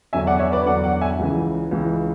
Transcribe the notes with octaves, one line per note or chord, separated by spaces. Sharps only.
E2 D3 F#3 E5 G#5
D5 F#5
C#5 E5
B4 D5
E2 D3 F#3 D5 F#5
D5 F#5
E5 G#5
C#2 C#3 E3
C#2 C#3 E3